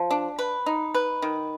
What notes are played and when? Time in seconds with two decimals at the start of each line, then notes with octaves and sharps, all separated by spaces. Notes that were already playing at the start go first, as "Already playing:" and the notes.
Already playing: F3
0.11 D4
0.39 B4
0.66 D#4
0.94 B4
1.22 D#3